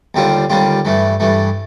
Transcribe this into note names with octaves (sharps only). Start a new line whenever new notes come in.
D#2 D3 G3 C4 F4
D#2 D3 G3 C4 F4
G2 E3 A3
G2 E3 A3